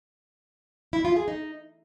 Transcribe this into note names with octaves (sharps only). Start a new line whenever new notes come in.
E4
F4
G#4
D#4